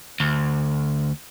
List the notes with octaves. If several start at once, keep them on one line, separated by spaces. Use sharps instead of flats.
D2